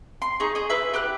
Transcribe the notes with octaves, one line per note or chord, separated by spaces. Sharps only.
C6
D#4 G#4 C#6
G#4 D#5
E4 B4 E5
G4 B4 F#5 F#6